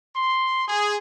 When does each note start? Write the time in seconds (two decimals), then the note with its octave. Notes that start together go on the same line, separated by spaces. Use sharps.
0.16 C6
0.68 G#4